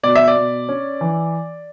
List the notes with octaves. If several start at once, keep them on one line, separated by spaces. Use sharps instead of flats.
B2 D5
E5
D5
B2
C#4
E3